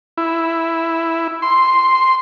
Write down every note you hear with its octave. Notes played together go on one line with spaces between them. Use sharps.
E4
C6